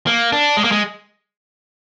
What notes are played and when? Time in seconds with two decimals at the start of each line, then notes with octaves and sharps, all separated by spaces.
0.07 A#3
0.32 D4
0.57 G#3
0.64 A#3
0.72 G#3